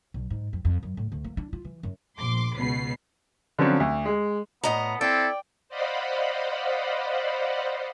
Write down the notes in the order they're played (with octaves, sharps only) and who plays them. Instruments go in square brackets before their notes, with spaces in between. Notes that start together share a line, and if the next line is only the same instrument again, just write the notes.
[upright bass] B1
G#2
F2
F2
F#2
A2
D2
A#3
D4
F4
E3
F#2
[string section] A#1 C6 D6
C#2 B2 B4 C7
[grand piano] D3 F3 F#3 C4 C#4
D2
G#3
[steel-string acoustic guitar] A2 D#5 A#5 [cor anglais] B3
[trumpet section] C4 E4 A4 [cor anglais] D5 [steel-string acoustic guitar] G5
[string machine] C5 D5 D#5 F5 F#5 B5